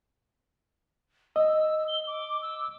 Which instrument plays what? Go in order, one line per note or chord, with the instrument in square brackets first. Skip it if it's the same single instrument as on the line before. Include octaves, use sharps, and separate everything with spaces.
[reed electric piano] D#5 [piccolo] E6
[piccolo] G7
D6
E6